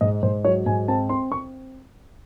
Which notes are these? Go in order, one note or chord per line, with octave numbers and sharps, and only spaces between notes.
G#2 D#5
G#2 C5
F#3 C#5
G#2 G#5
C4 A5
C4 C6
C4 C#6